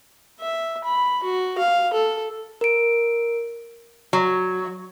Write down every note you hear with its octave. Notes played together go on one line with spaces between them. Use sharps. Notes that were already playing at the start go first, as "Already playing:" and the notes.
E5
B5
F#4
F5
A4
A#4 D7
F#3